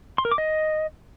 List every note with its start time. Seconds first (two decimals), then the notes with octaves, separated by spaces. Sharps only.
0.18 C6
0.25 A#4
0.32 D6
0.38 D#5